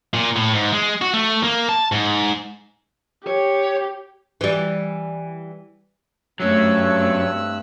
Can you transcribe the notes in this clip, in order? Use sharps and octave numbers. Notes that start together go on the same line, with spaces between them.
A#2
A2
G#2
G#3
F#4
A3
A#3
A5
G#2
G4 C#5
E3 G3
G2 F#3 A3 C4 C#4 C#5 E6 F#6